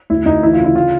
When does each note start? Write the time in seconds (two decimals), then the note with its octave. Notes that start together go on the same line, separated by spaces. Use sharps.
0.10 D2 E4
0.26 D2 D#4
0.43 E3 E4
0.53 F4
0.59 C#3
0.64 E4
0.75 F4